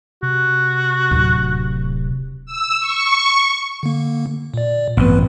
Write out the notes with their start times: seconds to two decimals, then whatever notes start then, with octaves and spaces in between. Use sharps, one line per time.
0.23 C3 F#4
1.11 D1
2.45 E6
2.79 C#6
3.83 D3 A#3
4.54 A#2 D5
4.97 A1 G2 B3 C4 B4